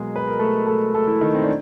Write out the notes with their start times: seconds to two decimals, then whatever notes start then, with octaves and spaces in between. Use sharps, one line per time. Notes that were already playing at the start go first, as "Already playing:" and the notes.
Already playing: B2 F#3 G#3 A#3 G#4
0.16 B4
0.27 A#4
0.39 A3 A4
0.66 A3 A4
0.94 A3 A4
1.07 E3 E4
1.21 D#3 D#4
1.35 C4
1.43 D4